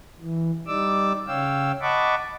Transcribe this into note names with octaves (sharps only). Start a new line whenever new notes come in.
E3
G3 D#4 D5 D6 E6
C#3 C#5 F5 G5 E6
D#5 F#5 A5 B5 C#6 D6